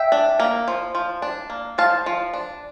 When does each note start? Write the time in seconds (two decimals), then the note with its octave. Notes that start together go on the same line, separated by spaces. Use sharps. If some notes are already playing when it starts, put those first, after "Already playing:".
Already playing: E5 G5
0.12 D4
0.40 A#3
0.68 F3
0.95 F3
1.22 D4
1.50 A#3
1.78 F3 F5 A5
2.06 F3
2.34 D4